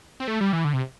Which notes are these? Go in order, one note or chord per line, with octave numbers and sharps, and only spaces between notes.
C4
A3
G3
E3
D3
C3